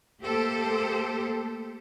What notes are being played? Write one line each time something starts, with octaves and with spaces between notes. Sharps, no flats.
A3 A#3 G4 A4 C5